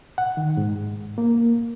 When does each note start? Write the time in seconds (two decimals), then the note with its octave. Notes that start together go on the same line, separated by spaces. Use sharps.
0.18 F#5
0.37 D#3
0.57 G#2
1.18 A#3